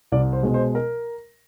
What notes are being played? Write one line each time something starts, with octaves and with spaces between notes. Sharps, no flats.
C2 D5
C5
B2 G#3
C5
A#4